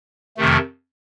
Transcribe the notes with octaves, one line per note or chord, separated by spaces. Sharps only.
F2 C3 D#3 A3